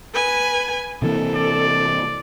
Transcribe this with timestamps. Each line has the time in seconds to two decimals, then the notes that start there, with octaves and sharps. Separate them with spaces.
0.14 B4 G#5
1.02 C3 E3 A#3 A4
1.36 D5